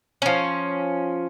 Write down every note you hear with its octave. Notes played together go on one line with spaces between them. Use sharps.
F3 C#4